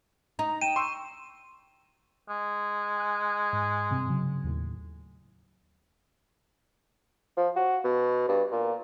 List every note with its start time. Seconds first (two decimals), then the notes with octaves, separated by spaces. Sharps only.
0.39 D#4 A#5
0.62 G5 D#7 E7
0.76 C6 C#6 E6
2.29 G#3
2.97 G#5 F#6
3.53 G#2
3.90 G2 C3 C4
4.08 C#3 F#3
4.44 D#2 A2
7.37 F3
7.56 F#4
7.84 B2
8.28 G2
8.52 A#2